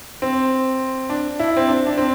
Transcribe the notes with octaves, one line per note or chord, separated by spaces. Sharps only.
C4
D4
E4
C4
D4
D4
C4